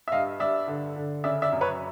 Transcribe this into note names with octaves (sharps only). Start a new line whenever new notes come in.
E5
G2 D#5 F5
G2 D5 E5
D3
D3
C#3 D5 E5
D5 E5
F#2
B4 C#5